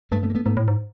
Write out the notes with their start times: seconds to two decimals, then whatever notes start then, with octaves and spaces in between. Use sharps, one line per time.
0.11 G2 G3 A3
0.23 A3 B3
0.30 A#3
0.35 A3 B3
0.45 G#2 A3 B3
0.57 A2
0.68 G#2